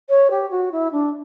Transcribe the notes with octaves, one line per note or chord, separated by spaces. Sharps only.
C#5
G4
F#4
E4
D4